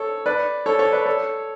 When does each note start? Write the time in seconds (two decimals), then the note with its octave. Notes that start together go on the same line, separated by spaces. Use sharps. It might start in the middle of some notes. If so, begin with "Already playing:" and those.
Already playing: A4 C#5
0.26 B4 D5
0.66 A4 C#5
0.79 A4 C#5
0.92 B4 D5
1.06 A4 C#5